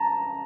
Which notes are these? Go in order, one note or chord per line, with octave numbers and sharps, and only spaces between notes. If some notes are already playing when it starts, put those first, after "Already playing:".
Already playing: A5 A#5